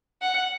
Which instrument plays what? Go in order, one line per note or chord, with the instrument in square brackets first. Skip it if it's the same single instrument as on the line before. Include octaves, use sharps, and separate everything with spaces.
[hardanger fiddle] F#5